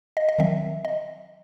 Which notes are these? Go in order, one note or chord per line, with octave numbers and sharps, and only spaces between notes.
D#5
D#5
D#3 F#3 C4 E5
D#5